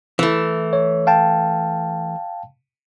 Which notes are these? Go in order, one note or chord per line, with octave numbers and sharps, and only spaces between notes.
E3 A3
C#5
F5 G5 A5